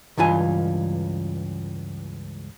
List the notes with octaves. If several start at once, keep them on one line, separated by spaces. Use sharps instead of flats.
C#2 G2 E3 F4 G#5